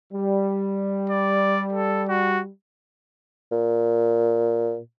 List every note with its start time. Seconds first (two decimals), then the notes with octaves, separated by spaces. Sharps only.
0.13 G3
1.10 D5
1.73 A4
2.09 F#4
3.52 A#2